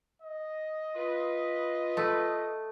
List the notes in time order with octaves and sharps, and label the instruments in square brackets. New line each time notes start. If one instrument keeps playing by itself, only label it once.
[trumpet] D#5
[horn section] F4 B4
[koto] A3